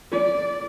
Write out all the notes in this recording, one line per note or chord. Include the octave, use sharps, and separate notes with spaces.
D5